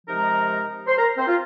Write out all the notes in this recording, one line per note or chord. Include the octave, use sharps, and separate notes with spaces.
C3 F3 G#3 D#4 A#4 A#5
C5 C6
A#4 A#5
C4 C5
F4